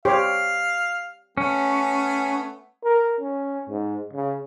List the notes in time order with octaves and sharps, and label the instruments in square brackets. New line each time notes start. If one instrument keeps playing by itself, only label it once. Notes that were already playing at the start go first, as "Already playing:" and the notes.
[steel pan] G4 C5 C#5 [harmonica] F5
[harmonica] A3 B3 G#5 [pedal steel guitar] C#4
[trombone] A#4
C#4
G#2
C#3